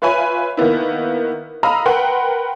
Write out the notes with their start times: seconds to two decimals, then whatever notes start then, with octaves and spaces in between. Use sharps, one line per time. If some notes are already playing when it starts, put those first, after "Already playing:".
0.02 F4 B4 C#5 E5 G#5 B5
0.57 D#3 A#3 B3 E4
1.63 D#5 F5 A#5 B5 E6 F6
1.86 A#4 B4 F#5 G5 B5 C6